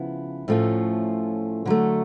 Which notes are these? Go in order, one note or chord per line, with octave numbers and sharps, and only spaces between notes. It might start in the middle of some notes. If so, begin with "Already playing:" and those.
Already playing: C#3 F3 B3 E4
A2 F3 A3 C#4 F4
D3 F#3 A3